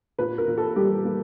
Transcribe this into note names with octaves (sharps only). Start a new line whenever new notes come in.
A#2 B4
A#4
A#2
A4
G3 G4
A#3